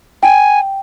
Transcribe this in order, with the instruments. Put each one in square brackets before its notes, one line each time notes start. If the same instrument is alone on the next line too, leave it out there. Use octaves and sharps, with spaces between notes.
[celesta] G5 [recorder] G#5